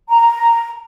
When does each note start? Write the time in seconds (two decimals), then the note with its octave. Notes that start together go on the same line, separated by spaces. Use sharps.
0.10 A#5